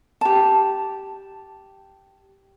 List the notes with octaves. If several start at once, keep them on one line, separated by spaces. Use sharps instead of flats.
G4 A5